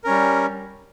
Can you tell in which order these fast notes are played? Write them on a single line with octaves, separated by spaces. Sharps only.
A#4 C#4 G3